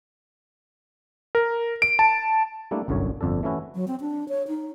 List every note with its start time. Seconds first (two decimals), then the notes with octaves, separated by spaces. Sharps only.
1.35 A#4
1.82 D7
1.99 A5
2.71 G3 A3 A#3 D4 E4
2.88 G1 C2 F#2 D3 C#5
3.21 G1 F2 D4 A4
3.43 E3 A3 C#4 E4 F#4
3.75 F#3
3.88 C4
4.01 D4
4.29 C#5
4.48 D#4